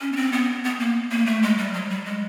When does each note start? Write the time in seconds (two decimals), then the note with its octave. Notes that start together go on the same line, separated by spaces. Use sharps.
0.01 C#4
0.12 B3
0.16 C4
0.32 B3
0.64 B3
0.80 A#3
1.11 A#3
1.26 A3
1.42 G#3
1.58 G3
1.73 F#3
1.90 G3
2.05 G#3